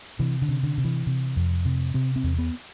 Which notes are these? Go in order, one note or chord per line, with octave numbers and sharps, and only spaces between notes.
C3 E3
D3
C3
D3
C3
E3
C3
F2
C3
C3 C4
C4
E2
B3